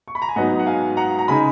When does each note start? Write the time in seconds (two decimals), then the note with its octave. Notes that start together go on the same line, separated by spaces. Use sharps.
0.08 C#6
0.15 B5
0.22 A#5
0.29 G#5
0.36 G#2 F#3 B3 D#4 D#5 F#5
0.59 F#5
0.66 F5 G#5
0.97 F#5 A#5
1.18 A#5
1.28 C#3 G#3 D#4 G#5 B5